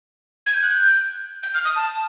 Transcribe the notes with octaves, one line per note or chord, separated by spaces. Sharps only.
G#6
G6
F#6
G6
G6
F6
D#6
A5